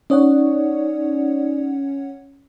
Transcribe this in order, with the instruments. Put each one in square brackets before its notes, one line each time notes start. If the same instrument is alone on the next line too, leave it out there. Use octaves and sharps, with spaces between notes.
[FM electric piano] C#4 C#5 F#5 [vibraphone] D#4 D5